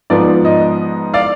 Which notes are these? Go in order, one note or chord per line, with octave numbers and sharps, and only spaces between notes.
G#2 F3 B3 D5
D#5
D5 F5